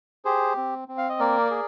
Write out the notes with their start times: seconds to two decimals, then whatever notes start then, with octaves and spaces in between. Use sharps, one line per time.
0.25 G4 G#4 C5
0.57 C4
0.88 C4
0.98 F5
1.09 D#5
1.20 A#3 A#4 D5
1.51 G#4